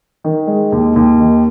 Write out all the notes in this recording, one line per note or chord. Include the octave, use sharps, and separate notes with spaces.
D#3
G#3
D#2
D#2
D#3